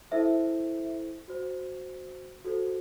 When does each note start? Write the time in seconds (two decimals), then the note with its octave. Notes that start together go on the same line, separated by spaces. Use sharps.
0.11 E4 A4 C5 E5
1.28 F#4 C5
2.45 F#4 A4 C5